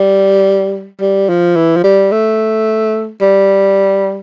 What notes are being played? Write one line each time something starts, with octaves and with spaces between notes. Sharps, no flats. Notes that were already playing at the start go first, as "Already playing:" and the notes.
Already playing: G3
G3
F3
E3
F3
G3
A3
G3